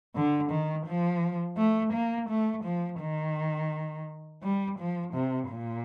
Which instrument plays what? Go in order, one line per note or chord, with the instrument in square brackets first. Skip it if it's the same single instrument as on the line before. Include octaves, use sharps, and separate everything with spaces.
[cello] D3
D#3
F3
A3
A#3
A3
F3
D#3
G3
F3
C3
A#2